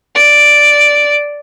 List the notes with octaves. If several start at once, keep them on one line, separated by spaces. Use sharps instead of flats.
D5